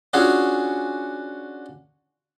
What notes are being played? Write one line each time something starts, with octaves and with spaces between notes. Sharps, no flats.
C#4 D4 F4 F#4 G#4